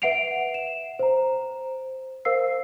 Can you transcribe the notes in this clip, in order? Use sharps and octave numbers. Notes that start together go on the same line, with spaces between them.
B4 E5 F#5 C7 D7 F7
E7
C5 A#5
A#4 C5 F5 E6 C7